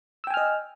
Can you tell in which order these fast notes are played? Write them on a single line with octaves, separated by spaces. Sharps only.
E6 G5 G#5 F6 D#5